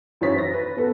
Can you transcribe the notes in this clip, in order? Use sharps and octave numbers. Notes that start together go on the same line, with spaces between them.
F#2 E3 C5 C#5 A6 B6
A#6
B4
B3 A4 B4